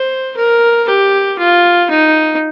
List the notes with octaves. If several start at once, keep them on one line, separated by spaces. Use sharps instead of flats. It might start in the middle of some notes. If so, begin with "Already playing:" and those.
Already playing: C5
A#4
G4
F4
D#4